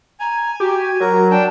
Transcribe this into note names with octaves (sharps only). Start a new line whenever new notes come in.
G#5 A#5
F#4 G4
F#3 A#4
D4 G5 A5